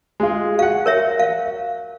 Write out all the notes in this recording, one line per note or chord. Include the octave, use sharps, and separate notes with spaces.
G#3 F4
F#4 F5 F#5
A#4 C#5 E5
F5